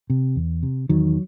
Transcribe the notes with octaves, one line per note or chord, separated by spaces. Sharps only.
C3
E2
C3
E2 D#3 F#3